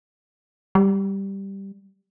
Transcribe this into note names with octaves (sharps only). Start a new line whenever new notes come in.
G3